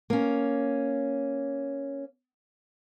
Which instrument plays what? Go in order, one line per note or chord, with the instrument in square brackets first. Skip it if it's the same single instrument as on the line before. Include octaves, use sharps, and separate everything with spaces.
[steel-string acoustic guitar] A#3 C#4